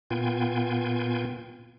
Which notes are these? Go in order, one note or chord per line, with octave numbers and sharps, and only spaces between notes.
A#2 B3 F4 G5 G#5